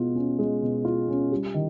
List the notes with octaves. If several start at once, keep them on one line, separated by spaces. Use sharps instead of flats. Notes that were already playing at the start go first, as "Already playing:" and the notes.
Already playing: B2 G#3 F4
C#4
G#3
B2
F4
C#4
G3
D#3